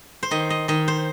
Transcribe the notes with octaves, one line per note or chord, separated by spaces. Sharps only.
C5
D#3 D#5
D#5
D#3 D#5
C5